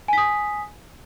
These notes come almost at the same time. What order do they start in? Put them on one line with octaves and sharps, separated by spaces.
G#5 B6 D#6